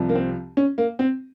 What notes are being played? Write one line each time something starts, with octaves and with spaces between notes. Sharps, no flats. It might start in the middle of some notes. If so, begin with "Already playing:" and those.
Already playing: C2 C3 F3
A#3
C4
C#4
A#3
C4